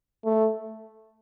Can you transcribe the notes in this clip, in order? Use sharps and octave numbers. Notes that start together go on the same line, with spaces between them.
A3